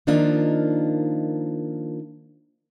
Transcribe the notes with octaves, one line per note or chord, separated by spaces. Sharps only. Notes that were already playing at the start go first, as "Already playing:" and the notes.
D#3 F3 A#3 D4 D#4 F4